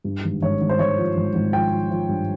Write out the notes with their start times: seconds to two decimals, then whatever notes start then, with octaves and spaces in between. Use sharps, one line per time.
0.04 G2
0.24 G#1
0.42 G#1 C#5
0.61 G#1
0.69 C5
0.79 G#1 C#5
0.98 F3
1.16 G#1
1.35 G#1
1.53 F3 G5
1.72 F3
1.90 F3
2.09 G2